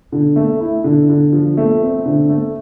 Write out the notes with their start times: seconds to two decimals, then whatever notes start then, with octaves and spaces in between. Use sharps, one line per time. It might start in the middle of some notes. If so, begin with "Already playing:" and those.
0.12 D3
0.36 A3
0.60 E4
0.84 D3
1.09 D3
1.33 F3
1.57 A3
1.81 C4
2.05 D3
2.29 A3